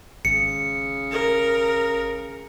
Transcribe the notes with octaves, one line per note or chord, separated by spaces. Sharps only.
G#1 C#3 C#7
A#4